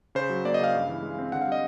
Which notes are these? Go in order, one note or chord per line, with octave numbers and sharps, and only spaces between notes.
C#3 C5
F#3
A#3 D5
D#5
C#3 F5
G2
E3
G#3
C4
D3 F#5
F5
G3 D#5